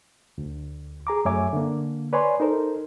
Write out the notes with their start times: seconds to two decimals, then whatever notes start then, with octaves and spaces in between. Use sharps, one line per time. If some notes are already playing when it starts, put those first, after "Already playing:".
0.38 D2
1.07 G#4 A#5 D6
1.25 F#2 A3 C#5 E5 G#5 D6
1.53 D3 A#3
2.13 B4 C#5 D5 G#5 C6
2.40 D#4 A4 A#4 C5